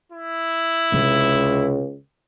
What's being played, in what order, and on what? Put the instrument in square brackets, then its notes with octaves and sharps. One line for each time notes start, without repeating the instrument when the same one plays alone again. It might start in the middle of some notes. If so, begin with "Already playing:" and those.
[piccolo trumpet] E4
[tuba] C#2 [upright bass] C3 G#3